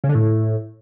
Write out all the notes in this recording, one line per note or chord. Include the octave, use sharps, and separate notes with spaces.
C#3
D3
A2